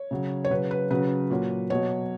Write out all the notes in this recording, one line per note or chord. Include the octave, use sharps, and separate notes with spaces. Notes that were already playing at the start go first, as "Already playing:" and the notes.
Already playing: C#5
C#3 F#3
C#5
C#3 F#3 B4
B4
C#3 F#3 B4
A#2 F#3
B2 F#3 C#5